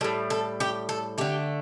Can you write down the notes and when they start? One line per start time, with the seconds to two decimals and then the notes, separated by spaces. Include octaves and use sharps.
0.01 A2 G3 A4
0.30 A4
0.60 G4
0.89 A4
1.18 D3 A3 G4